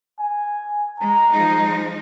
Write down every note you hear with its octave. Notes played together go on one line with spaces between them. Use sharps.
G#5
G#3 A#5
F3 G#3 D#4